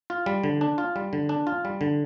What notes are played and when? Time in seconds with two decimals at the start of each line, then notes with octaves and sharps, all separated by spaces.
0.10 F4
0.26 G3
0.43 D3
0.61 D4
0.78 F4
0.96 G3
1.13 D3
1.29 D4
1.47 F4
1.65 G3
1.81 D3